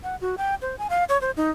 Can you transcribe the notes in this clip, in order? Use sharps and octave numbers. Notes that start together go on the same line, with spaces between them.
F#5
F#4
G5
C5
G#5
F5
C#5
C5
D#4